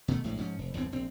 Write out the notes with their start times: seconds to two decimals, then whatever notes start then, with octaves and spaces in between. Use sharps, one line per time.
0.08 B2 D#3 A3
0.24 A#1 A2 G#3
0.37 G#2 F3 C#4
0.59 F1
0.74 G1 E2 G2 C4
0.92 A#1 C4